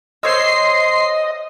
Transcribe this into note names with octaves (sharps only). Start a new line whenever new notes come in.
C5 C#5 D#5 C6 E6 C7